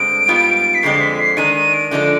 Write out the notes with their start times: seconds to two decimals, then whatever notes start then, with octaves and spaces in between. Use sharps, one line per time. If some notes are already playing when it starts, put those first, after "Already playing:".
Already playing: G2 D3 G#3 C4 D7
0.28 G#2 G3 B3 F4
0.75 B6
0.82 F2 D3 G#3 C4 C7
1.01 B6
1.19 C7
1.37 D#3 G#3 D4 D#7
1.55 D#7
1.73 D7
1.91 D3 F3 G#3 D4 D7